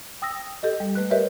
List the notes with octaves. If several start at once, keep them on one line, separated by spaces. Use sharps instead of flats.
G5 D#6 E6 A#6
G4 A4 D#5
G3
A3 B4 F#6
G4 A#4 B4 C#5 D#5 E5